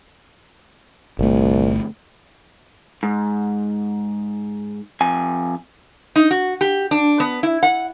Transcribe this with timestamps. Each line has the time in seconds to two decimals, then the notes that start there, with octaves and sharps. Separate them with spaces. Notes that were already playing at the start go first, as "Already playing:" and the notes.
1.19 G1 C2 A3
3.03 G#2
5.01 F2 G#5
6.16 D#4
6.31 F#4
6.61 G4
6.91 D4
7.20 B3
7.43 E4
7.63 F#5